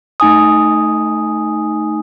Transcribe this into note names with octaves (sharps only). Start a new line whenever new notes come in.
A3 D#4 G#5 D#6